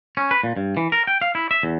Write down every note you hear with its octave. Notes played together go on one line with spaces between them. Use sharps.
C#4
B4
A#2
G2
E3
A#4
G5
F5
E4
E5
E2